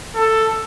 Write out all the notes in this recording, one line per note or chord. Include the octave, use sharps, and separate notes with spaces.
A4